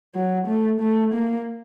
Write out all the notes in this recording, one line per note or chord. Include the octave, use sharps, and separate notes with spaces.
F#3
A3
A3
A#3